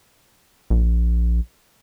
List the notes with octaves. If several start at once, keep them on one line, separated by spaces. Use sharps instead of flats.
A#1